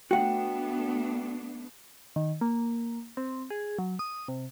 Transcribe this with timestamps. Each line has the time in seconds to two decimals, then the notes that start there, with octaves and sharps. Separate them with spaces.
0.11 A3 B3 D4 F#4 F#5 G5
2.16 D#3
2.41 A#3
3.17 C4
3.50 G#4
3.79 F#3
3.99 D#6
4.28 C3